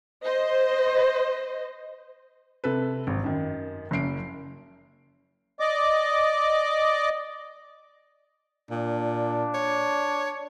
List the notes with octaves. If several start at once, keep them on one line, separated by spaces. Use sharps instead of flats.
C5 D#5
C3 A4 B4
G#1
F#2 D#3
F#1 F#2 C7 D7
D5 D#5 D6
A#2 D4
C#5